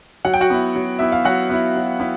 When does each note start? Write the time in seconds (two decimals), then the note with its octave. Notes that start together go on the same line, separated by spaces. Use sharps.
0.25 F#3 F#5
0.34 G5
0.41 F#4 F#5
0.50 B3 E4
0.75 F#3
0.99 B3 E4 E5
1.12 F5
1.25 F#3 F#4 F#5
1.50 B3 E4
1.75 F#3
2.00 B3 E4